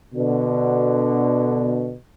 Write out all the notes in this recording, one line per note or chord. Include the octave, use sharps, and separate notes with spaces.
B2 D3